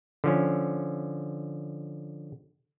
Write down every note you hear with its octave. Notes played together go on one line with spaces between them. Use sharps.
D3 F3 C#4